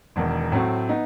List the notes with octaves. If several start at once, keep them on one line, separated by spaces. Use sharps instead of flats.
E1 E2 D#3
A2 F#3 A3 C4
B3 D#4